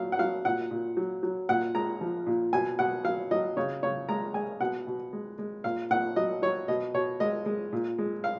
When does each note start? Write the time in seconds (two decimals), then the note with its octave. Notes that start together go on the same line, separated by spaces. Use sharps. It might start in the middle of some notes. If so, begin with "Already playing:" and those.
Already playing: A#2 F#3 F5
0.12 F#5
0.19 F#3 F5
0.45 A#2 F#5
0.71 A#2
0.97 F#3
1.23 F#3
1.49 A#2 F#5
1.75 G#3 A#5
2.01 F3
2.26 A#2
2.53 B2 G#5
2.79 B2 F#5
3.05 F#3 F5
3.31 F#3 D#5
3.57 C#3 C#5
3.83 C#3 C#5
4.09 G#3 A#5
4.34 G#3 G#5
4.60 B2 F#5
4.87 B2
5.13 G#3
5.39 G#3
5.64 A#2 F5
5.90 A#2 F#5
6.16 F#3 D#5
6.42 F#3 C#5
6.68 B2 D#5
6.94 B2 C#5
7.20 G#3 D#5
7.46 G#3
7.73 A#2
7.98 G#3
8.24 F5